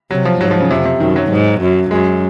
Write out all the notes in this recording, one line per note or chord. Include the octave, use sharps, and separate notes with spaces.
C3 F#3
F3
G#2 F#3
F3
C#3
F2 C3
C3
F#2 D#3
F#3
G#2
F#2
F#2 G#3